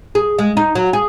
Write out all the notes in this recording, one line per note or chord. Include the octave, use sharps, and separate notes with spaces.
G#4
G#3
D#4
F#3
G#4